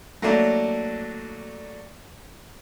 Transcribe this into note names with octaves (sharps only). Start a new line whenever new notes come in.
F#3 A3 A#3 D4